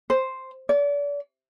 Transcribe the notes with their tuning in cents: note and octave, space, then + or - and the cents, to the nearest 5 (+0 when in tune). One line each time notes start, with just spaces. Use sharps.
C5 +0
D5 -35